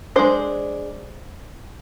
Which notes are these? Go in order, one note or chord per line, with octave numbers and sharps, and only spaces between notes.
G#3 D4 C5